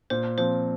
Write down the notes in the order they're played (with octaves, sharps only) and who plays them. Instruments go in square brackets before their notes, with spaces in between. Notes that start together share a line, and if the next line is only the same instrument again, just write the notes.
[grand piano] A#2 [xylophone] C5
[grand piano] F3 C4 [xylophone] C5